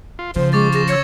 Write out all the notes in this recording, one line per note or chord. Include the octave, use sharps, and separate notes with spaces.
F4
C#3 F3 C5
G#3 C#6 D6 A6
G#4 A#6 E7
C#5 E6 G#6 C#7